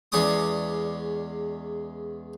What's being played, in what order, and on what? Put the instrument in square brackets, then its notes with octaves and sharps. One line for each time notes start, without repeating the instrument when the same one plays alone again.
[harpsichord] E2 G#3 C#4 D5 D6 D#6